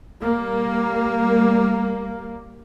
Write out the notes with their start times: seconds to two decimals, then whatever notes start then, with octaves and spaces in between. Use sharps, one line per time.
0.21 G3 A#3